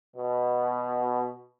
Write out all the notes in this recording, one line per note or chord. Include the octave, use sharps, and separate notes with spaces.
B2